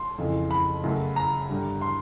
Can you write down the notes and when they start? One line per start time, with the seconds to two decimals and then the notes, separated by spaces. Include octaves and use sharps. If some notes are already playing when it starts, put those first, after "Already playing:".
Already playing: C6
0.18 F2 C#3 E3
0.51 B5
0.84 F#2 C#3 F#3 A3
1.16 A#5
1.49 G2 D3 G3
1.81 C6